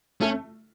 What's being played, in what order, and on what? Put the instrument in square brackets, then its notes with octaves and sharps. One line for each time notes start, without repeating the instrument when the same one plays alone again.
[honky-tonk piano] A3 [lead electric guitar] C#4